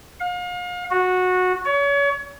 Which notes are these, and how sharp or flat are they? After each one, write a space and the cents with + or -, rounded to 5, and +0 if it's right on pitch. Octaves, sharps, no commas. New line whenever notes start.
F5 +40
F#4 -15
C#5 +35